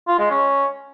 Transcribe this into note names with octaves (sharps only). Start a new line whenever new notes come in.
F4
G#3
C#4